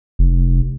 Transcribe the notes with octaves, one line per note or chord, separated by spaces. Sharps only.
F1